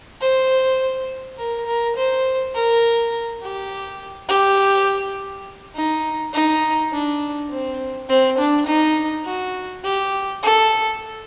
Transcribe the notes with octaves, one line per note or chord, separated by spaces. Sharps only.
C5
A#4
A#4
C5
A#4
G4
G4
D#4
D#4
D4
C4
C4
D4
D#4
F#4
G4
A4